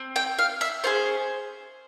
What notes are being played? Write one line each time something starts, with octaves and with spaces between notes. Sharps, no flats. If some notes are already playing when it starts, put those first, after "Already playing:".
Already playing: C4
G5
F5
E5
C#4 F4 G#4 C5